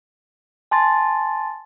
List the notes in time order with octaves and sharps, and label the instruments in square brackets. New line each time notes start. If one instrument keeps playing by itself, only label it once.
[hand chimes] G#5 A5 C6 A6